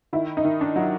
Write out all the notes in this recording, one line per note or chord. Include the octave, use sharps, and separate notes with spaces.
D#3 E4
D#4
D#3
D4
F#3